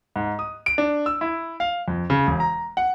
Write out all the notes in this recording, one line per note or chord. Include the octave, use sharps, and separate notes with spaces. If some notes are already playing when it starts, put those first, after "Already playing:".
G#2
D#6
D7
D4
E6
E4
F5
F2
C#3
E1
A#5
F#5